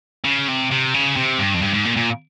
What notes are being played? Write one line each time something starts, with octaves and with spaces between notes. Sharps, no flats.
C#3
C3
C3
C#3
C3
G2
F2
G2
G#2
A#2
A#2